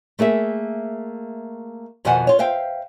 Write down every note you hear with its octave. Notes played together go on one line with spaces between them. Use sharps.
A3 A#3 G#4 E5
F2 B2 D#3 C5 F#5 G#5
F4 C#5
C5 E5 F5 G5